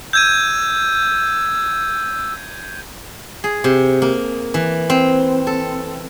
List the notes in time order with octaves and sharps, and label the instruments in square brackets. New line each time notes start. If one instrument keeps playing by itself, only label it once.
[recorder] E6 [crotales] G6 G#6 D#7
[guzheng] G#4
C3
A#3
E3
C4
A4